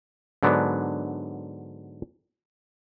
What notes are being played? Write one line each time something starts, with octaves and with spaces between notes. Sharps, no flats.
G#2 D3 F#3 B3 D4